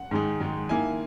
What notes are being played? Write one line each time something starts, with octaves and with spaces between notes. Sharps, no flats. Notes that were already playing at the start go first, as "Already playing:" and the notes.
Already playing: F#5
G#2 D#3 G#3 D#4
G#2 D#3 G#3 D#4
D#3 A#3 E4 G#5